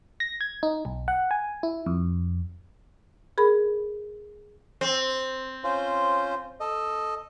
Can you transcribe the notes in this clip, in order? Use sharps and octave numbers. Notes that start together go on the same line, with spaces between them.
A#6
G#6
D#4
B1
F#5
G#5
E4
F2
G#4 A#4 B5
C4
C#4 F4 C5
A4 D#5